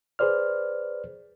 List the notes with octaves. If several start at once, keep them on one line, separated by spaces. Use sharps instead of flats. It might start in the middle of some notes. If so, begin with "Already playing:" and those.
G#4 B4 C5 D5 F6